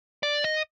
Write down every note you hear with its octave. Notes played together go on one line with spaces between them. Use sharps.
D5
D#5